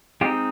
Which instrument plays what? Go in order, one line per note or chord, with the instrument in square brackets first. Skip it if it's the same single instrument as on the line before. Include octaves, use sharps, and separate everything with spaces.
[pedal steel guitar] G#3 C4 D#4 F4 G4